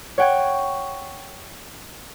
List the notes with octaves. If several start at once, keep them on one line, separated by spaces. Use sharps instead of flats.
C#5 F#5 G5 C#6 G#6